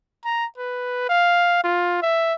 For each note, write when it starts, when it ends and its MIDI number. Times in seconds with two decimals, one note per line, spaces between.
0.25 0.45 82
0.57 1.06 71
1.09 1.60 77
1.64 1.98 65
2.02 2.34 76